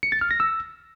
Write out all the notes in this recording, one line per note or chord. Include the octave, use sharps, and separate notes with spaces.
C#7
A6
F6
A#6
E6